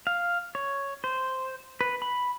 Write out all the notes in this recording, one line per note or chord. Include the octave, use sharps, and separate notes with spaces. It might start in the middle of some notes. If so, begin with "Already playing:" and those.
F5
C#5
C5
B4
B5